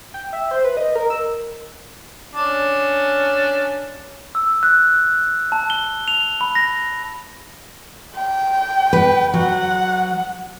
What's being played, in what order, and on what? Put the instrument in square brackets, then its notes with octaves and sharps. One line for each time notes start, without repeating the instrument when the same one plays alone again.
[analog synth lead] G5
E5
C5
B4
D#5
A#4
E6
[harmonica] C#4 D4
[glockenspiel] E6
F#6
A5
G7
F7
B5
A#6
[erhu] G5
[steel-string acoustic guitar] B4
[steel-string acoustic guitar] F#3 [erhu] F#5